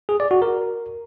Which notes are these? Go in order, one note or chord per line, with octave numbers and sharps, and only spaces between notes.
G#4
D5
F#4
A#4